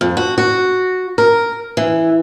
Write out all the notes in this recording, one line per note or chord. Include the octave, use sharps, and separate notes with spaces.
F2
F#4
F#4
A#4
E3